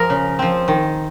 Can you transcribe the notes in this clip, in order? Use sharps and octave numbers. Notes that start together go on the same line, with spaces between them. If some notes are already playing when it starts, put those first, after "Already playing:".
Already playing: F3 G#4 A#4
C#3
F3 C4
D#3